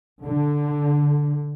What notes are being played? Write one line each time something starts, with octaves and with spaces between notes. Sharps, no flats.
D3